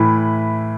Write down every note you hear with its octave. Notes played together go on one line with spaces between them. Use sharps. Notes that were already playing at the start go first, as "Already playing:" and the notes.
Already playing: A2 E3 B5